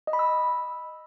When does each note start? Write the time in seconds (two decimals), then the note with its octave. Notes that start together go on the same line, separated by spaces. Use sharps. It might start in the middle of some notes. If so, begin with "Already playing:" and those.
0.07 D#5
0.13 B5
0.19 E6